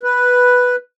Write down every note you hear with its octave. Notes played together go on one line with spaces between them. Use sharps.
B4